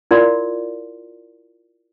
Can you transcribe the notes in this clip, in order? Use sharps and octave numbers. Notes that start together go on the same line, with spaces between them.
E4 F4 A#4 D5 F5 C6